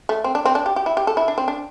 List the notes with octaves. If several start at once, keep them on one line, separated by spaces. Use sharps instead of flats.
A3
C4
D4
C4
D4
G4
G4
E4
G4
A4
E4
D4
C4
D4